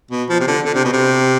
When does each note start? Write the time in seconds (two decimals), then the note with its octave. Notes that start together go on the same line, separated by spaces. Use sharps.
0.11 B2
0.29 F3
0.40 C3
0.47 D3
0.65 D3
0.75 C3
0.84 B2
0.93 C3